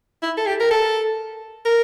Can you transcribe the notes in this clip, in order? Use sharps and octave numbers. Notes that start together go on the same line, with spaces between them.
E4
A4
G4
A#4
A4
A#4